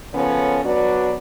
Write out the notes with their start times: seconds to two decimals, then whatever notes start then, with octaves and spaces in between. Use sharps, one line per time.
0.14 C#3 F3 B3 C#4 A4 C#5
0.64 F#3 B3 D4 F#4 B4 D5